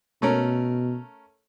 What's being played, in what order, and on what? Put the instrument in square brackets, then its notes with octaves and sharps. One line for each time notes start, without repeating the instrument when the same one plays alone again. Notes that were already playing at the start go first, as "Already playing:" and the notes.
[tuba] B2 [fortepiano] A3 C#4 A#4